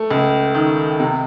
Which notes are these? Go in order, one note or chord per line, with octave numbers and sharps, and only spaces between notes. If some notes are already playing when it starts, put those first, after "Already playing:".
Already playing: A3
C#2
D#3
C3